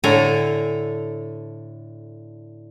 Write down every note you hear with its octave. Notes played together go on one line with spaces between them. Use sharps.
A2 D3 A4 G#5 A#5